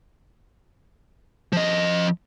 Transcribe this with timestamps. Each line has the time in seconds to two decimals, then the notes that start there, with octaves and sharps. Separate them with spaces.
1.53 F3 D#5